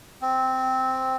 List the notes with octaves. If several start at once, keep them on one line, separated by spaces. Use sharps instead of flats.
C4